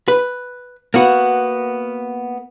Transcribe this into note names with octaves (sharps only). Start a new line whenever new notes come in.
B4
A#3 B3 F#4